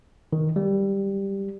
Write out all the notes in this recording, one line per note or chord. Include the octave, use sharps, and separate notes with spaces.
D#3
G3